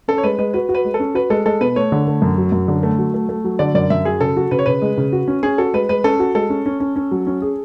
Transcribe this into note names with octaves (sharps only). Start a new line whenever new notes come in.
C#4 A4
C#5
G#3 B4
G#3 B4
F#4 B4
F#4
B4
G#3
A4
C#4
F#4 B4
G#3 A4
G#3 A4
B2 B4
A3 C#5
D3
A3
F#2
F#3
F#2
D3
A3
F#3
A3
A3
F#3
D3 D5
F#2 D5
F#2 E5
F#3 G#4
C#3 A4
F#4
C#3 B4
C#5
C#3 B4
G#3
C#3
F#4
C#4
C#4 G#4
F#4 A4
G#3 B4
G#3 B4
C#4 A4
F#4
G#3 A4
C#4
C#4
C#4
C#4
F#3
C#4
G#4